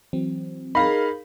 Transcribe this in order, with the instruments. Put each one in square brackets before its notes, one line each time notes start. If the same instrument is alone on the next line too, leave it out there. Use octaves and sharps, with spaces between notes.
[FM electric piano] E3 F#3 C4
[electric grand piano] D#4 F5 [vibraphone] G#4 A#4 [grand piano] B5